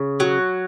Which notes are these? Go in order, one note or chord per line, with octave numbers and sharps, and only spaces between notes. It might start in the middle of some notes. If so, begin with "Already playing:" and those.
Already playing: C#3
F#3